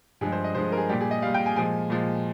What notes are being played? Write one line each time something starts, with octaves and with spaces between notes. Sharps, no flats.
G2 F3 G#3 G#4
C5
D#5
G2 F3 G#3 C5
A#4
G#4
A#2 G3 G4
G#4
D#5
A#2 G3 F5
G5
G#5
A#2 F3 G#3 G#5
A#2 F3 G#3